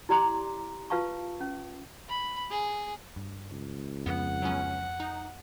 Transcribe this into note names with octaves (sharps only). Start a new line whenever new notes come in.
E4 G4 D5 A#5 C6 D6
F4 B4 F5 A5 C#6
C#4
B5
G#4
G2
C#2
F2 F3 B3 C4 F#5
F#3 B3 C#4
D#4